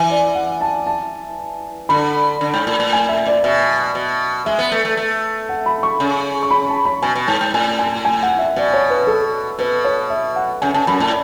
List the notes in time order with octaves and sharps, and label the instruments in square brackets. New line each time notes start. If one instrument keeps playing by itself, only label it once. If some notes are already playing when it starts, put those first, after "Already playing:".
Already playing: [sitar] E3 [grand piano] E5
[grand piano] D5
F#5
A5
A5
[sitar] D3 [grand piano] B5
[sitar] D3
G#2
A2
A2
[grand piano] G#5
E5
D5
[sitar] B2 [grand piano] E5
[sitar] B2
[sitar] G#3 [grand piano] E5
[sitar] B3
A3
A3
A3
[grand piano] F#5
B5
C#6
[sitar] C#3
[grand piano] C#6
B5
A5
B5
[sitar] B2 [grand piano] G#5
[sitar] B2
[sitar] G#2 [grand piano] A5
[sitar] G#2
[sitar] A2 [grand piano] G#5
[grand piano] G#5
G#5
F#5
E5
[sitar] B2 [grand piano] D5
[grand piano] C#5
B4
A4
[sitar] B2 [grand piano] B4
[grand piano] C#5
E5
F#5
[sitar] C#3 [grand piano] G#5
[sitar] C#3 [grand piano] A5
[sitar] F#2 [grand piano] B5
[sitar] A2 [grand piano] A5